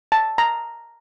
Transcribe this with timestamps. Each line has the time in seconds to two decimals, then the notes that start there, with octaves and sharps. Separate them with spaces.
0.12 A5
0.38 A#5